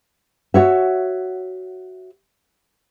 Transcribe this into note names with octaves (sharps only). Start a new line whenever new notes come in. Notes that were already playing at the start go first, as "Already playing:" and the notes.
F#4 C#5 E5